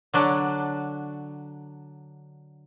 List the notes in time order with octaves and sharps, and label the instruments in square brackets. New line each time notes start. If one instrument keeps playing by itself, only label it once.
[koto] D3 F#3 D4